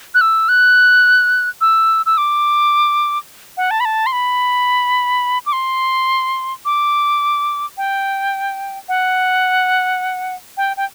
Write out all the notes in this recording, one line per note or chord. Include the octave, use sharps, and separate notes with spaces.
F#6
E6
F#6
E6
E6
D6
F#5
A5
B5
A5
C6
B5
D6
C6
D6
G5
F#5
G5
G5